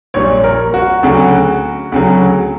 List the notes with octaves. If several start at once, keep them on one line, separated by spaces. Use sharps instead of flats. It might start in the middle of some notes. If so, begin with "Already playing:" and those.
A#1 A#2 G3 C#5
A#4
F#4
D2 C#3 F#3
D2 C#3 F#3